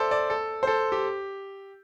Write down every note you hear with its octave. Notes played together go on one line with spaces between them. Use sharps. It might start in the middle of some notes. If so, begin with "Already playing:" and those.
Already playing: A4 C5 D5 E5
D5
A4
C5
A4
G4